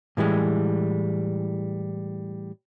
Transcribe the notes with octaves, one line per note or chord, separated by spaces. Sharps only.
A2 E3 G3 G#3